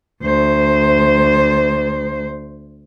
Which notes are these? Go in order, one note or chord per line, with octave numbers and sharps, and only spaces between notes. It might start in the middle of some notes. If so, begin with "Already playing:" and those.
D2 C5